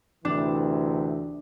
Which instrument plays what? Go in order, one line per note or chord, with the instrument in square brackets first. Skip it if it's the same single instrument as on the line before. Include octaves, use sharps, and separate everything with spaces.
[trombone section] D2 C3 E3 [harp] D4